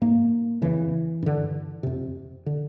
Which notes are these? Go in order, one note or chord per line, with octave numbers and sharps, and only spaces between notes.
G#2 A#3
F2 C#3 E3
G2 D3
F2 C3
D3